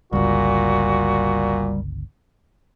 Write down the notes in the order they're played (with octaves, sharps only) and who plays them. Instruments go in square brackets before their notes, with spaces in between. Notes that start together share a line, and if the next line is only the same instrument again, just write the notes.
[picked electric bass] G1 C#2 [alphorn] A#2 [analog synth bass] G3 [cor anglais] F#4